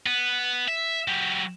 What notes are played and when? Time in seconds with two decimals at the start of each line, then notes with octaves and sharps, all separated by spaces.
0.06 B3
0.68 E5
1.08 F#3 G4